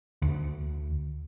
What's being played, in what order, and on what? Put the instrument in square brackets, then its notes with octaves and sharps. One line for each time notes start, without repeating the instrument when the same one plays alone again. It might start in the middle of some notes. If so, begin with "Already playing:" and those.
[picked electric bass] D2